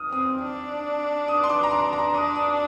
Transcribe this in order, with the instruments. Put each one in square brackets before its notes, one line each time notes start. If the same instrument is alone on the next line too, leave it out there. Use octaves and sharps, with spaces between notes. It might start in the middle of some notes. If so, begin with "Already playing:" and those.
Already playing: [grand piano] D#6 F6
[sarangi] C4 [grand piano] D#6
[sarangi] D4
[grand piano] D#6
C6
D6
A#5
C6
A#5
[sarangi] D4 [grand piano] D#6
[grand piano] D#6